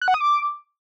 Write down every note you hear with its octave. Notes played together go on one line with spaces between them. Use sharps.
F#6
F#5
D#6
D6